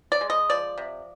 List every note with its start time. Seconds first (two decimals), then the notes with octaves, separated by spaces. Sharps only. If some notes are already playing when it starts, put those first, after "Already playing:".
0.12 D5
0.21 G#3
0.30 D#5
0.49 F3 D5
0.78 C3